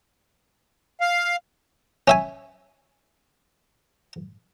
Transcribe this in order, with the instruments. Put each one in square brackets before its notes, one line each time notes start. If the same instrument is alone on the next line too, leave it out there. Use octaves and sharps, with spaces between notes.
[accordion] F5
[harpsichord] C#4 E5 G#5